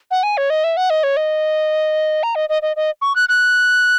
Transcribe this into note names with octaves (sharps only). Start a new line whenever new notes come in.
F#5
G#5
C#5
D#5
E5
F#5
D#5
C#5
D#5
A#5
D#5
D#5
D#5
D#5
C#6
F#6
F#6